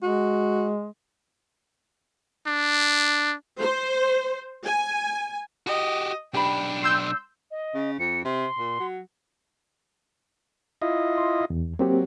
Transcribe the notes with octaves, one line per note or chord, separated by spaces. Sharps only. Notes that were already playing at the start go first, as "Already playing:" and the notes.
G#3 F#4
D4
C5
G#5
F#4 G4 D#5
B1 D4 G4 B4 G5 B5
C6 E6 G6
D#5
C#3
F2 C#7
C3 C6
A#2
F#3
E4 F4 D#5
C6
E2
F#3 A#3 C4 G4